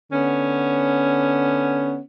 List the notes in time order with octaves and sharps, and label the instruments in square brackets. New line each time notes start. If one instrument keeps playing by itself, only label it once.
[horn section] D3 B3 C#4